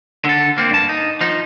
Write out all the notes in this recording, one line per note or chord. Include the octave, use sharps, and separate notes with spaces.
D3 A4
A#3 C4
G2 A5
D#4
F3 D#4